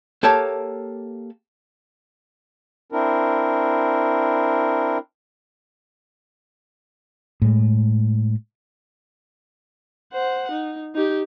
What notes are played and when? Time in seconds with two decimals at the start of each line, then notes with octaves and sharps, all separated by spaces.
0.23 A#3 G4 A4 C#5 A5
2.92 C4 D4 E4 A#4
7.42 A2 G#3
10.13 C5 F#5
10.52 D#4
10.95 D#4 G4